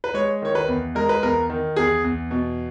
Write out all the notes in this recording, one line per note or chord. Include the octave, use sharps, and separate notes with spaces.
B4
G#3 C#5
D#3 C#5
B4
E2
G#3 A#4
B4
E2 A#4
D#3
E2 G#4
E2
B2